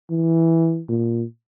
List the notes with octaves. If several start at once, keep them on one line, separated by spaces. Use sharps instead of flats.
E3
A#2